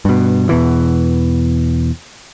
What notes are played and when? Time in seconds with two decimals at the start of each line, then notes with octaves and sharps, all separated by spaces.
0.05 G2 B2
0.49 E2 B2 E3